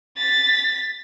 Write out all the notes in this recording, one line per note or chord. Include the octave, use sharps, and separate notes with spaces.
A6 B6